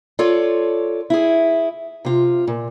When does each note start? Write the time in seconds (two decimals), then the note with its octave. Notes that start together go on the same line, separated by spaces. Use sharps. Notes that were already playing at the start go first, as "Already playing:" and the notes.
0.19 F4 A4 C#5 D5
1.10 E4 G#4
2.05 C3 F4
2.47 A#2